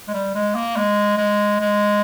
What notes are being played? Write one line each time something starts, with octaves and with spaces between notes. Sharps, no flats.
G#3
G3
G#3
A#3
G#3
G#3
G#3